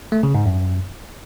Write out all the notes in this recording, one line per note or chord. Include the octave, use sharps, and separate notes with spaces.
A3
C#3
G#2
F#2